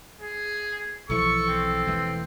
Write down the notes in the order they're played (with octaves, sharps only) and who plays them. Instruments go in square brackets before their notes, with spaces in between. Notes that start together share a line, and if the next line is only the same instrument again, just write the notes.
[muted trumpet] G#4
[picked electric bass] B1 E3 F3 [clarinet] A4 [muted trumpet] C#6
[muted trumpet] C4
[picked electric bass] E1 E3 A3